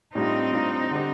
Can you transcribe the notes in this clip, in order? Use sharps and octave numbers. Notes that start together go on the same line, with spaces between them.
A2 G3 C4 D4 D#4 F4
A2 G3 D4 F4
D3 G3 D4 G4